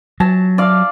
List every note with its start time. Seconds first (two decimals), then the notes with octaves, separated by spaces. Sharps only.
0.20 F#3 A5
0.58 D5 F5